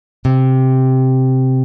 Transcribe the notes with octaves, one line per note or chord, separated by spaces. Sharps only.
C3